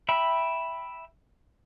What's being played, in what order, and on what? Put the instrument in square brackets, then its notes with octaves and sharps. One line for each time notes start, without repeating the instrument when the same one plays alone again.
[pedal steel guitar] E5 G5 B5